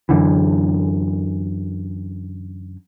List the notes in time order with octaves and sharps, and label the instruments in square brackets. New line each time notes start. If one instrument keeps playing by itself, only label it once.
[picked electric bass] F#2 D3 E3